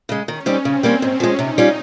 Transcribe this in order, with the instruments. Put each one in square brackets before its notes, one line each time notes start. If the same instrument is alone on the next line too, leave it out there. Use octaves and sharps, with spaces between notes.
[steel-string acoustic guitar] C#3 G#3
[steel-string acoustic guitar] D#3 [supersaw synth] C#4
[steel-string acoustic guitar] G3 C4 D#4 G4
[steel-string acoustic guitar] C#3 [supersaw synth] C4
[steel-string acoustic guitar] G3 A#3 C#4
[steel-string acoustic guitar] G#2 [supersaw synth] C#4
[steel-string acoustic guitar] F3 G#3
[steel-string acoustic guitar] C3 [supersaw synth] D#4
[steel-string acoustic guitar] G3 C#4 F4